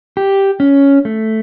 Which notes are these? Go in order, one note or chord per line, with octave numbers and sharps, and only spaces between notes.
G4
C#4
A3